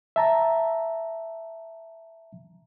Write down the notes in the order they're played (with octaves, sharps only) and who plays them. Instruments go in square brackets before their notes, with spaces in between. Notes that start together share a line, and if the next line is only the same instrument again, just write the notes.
[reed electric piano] E5 A5 A#5